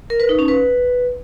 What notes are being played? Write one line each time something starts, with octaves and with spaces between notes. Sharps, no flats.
A#4
B4
D#4
C#4
B4